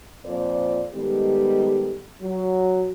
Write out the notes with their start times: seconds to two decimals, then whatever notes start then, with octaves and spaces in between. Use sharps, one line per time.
0.26 F2 A#2 F3 C5 D5
0.94 D#3 G3 G#3 B3 G4 A4
2.22 F#3